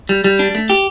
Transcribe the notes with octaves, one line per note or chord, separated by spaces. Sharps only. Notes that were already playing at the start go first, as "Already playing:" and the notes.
G3
G3
D4
A3
G4